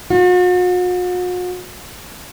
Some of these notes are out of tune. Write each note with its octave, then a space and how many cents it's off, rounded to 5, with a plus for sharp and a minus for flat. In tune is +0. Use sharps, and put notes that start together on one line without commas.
F#4 -45